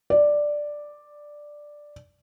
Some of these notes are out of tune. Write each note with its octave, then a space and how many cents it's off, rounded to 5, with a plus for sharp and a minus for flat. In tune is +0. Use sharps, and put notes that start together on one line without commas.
D5 +5